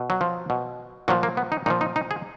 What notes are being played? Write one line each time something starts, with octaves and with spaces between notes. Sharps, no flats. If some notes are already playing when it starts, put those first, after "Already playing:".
Already playing: B2
F#3
F3
B2
A#2 F3 F#3
A#3
B3
D#4
A#2 F3 D#4
D#4
D#4
G#4